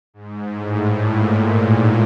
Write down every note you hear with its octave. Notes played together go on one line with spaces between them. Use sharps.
G#2
A2
A#2
A2